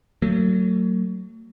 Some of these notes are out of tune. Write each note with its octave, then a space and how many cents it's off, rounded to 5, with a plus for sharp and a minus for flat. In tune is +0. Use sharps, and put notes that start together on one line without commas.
F#3 +15 A3 +45